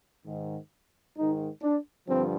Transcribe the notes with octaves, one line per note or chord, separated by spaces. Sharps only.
G#2 D#3
G#2 D#3 D#4
D4
G2 D3 F3 C4